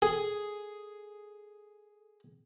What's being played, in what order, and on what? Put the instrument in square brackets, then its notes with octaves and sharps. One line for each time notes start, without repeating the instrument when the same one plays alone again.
[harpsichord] G#4 [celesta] A4